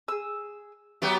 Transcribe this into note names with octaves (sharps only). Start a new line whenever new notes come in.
G#4 E6
F#3 B3 G4 E5 G5